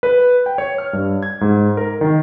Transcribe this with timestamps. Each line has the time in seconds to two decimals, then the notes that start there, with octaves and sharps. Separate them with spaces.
0.03 B4
0.46 G5
0.58 C#5
0.78 F6
0.93 G2
1.23 G#6
1.41 G#2
1.77 A#4
2.01 D#3